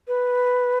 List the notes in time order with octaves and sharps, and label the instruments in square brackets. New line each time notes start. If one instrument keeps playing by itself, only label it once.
[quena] B4